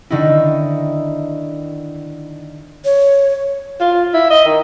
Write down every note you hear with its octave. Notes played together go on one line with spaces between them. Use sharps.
D3 D#3 D#4 E4
C#5
F4
E4
D#5
D#3